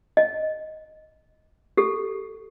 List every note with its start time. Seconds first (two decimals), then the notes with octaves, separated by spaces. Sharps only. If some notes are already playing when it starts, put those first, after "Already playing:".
0.17 D#5
1.77 G4 A4